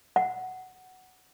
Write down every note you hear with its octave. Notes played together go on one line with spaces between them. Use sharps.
F#5